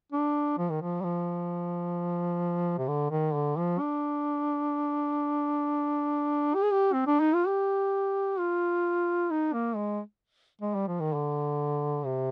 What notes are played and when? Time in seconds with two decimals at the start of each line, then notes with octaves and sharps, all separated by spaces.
0.12 D4
0.58 F3
0.70 D#3
0.82 F3
1.00 G3
1.04 F3
2.78 C3
2.88 D3
3.11 D#3
3.34 D3
3.57 F3
3.79 D4
6.55 G4
6.63 G#4
6.71 G4
6.93 C4
7.07 D4
7.20 D#4
7.34 F4
7.47 G4
8.39 F4
9.31 D#4
9.53 A#3
9.76 G#3
10.61 G#3
10.75 G3
10.88 F3
11.00 D#3
11.13 D3
12.05 C3